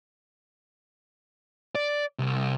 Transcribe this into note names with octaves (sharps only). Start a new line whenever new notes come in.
D5
C2